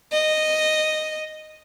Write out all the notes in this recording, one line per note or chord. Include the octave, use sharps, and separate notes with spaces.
D#5